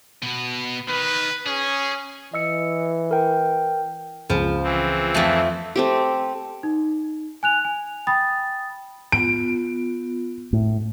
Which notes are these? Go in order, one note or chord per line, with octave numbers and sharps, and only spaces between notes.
B2 B3
D#3 B4
C#4 G#4
E3 D#5 E6 C#7
A#4 G5
C#2 F3
E3 C4
F2 A3
A3 C4 G4
D#4
G#5 F#6 F7
G#5
G5 B5 D#6 A6
B3 F4 D7
A2